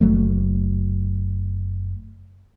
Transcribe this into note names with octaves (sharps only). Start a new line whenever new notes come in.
F#1 F#3 A3